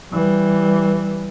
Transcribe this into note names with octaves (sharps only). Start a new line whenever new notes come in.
E3 G3